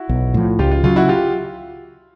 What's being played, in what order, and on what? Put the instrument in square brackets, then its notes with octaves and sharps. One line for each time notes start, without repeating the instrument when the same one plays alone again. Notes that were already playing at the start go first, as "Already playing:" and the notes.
Already playing: [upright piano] E4 F#4
[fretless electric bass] B1
A2 F3
[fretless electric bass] C#2 [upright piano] F4 G4
[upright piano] F4
[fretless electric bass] C#3 F#3 [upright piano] F4
[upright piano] E4 F#4
F4 G4